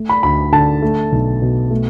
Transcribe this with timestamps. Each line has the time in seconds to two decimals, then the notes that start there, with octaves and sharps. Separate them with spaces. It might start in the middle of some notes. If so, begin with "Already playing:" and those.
Already playing: A3
0.09 B5
0.23 D2 B5
0.52 D3 A5
0.82 A3
1.12 B1
1.42 B2
1.71 A3